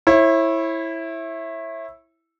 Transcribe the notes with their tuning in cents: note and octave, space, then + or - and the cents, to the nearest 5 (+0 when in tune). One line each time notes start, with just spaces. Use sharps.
E4 +0 C#5 -35